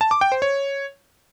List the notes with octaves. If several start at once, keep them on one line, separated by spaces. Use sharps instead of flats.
A5
D6
G5
C5
C#5